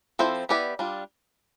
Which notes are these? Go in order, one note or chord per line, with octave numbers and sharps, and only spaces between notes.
F3 C4 E4 A4 C5
B3 E4 G4 B4 D5
G3 D4 F4